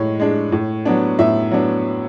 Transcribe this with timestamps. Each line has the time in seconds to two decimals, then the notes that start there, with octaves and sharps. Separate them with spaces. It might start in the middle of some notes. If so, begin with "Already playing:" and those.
Already playing: A2 G#3 C#5
0.20 G#3 D4
0.52 A2
0.85 F#3 B3 D4
1.19 A2 E5
1.51 F#3 B3 D4